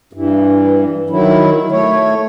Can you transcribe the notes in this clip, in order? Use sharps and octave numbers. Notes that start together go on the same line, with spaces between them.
G2 E3
D#3 F#3 E4
A3 C#5